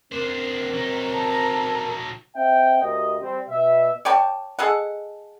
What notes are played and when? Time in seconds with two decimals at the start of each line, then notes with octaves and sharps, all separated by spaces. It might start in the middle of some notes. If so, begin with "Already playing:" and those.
0.12 C4 D4 A#4 C5
0.74 F#3 D#4
1.10 A4 A#5
2.36 C4 D#5 E5 F#5 G5
2.81 D2 G4 A#4 D5 D#5
3.21 G3 C4
3.49 B2 E5
4.05 C#5 D5 G5 A5
4.59 G#4 A4 D#5 F#5